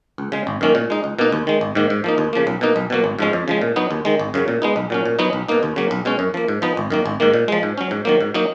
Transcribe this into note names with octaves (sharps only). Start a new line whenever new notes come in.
C#2
C#3 G#3
G#1
F#2 D#3 A#3 C#4
A#2
G#3 D#4
C#2
B2 A#3 D#4
D#2
D#3 G#3
G#1
G#2 D#3 A#3
G#2
F3 A#3 D#4
D#2
C#3 F3 A#3
B1
B2 A#3 D#4
B1
B2 F#3 A#3
G#1
G#2 F3 G#3 C#4
F2
C#3 F3 G#3
A#2
F#3 B3 D#4
D#2
D#3 G#3
G#1
F#2 C#3 F#3
A#2
G#3 B3 D#4
B1
A#2 F#3 C#4
A#2
F#3 B3 D#4
B1
B2 A#3 D#4
D#2
C#3 F#3 A#3
B1
B2 G#3 C#4
F#2
F3 A#3
G#2
F3 B3 D#4
G#1
F#2 D#3 A#3
G#1
G#2 D#3 A#3
A#2
F3 G#3
G#2
F#3 C#4
G#2
D#3 F#3 A#3
G#2
F#3 A#3 D#4